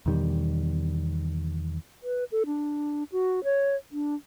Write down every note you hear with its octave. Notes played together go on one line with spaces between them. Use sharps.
E2 B2 D#3 G3
B4
A4
D4
F#4
C#5
D4